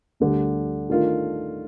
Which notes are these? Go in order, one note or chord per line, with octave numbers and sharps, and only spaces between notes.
D2 D3 G3
D#3 A3 D4 F4 A#4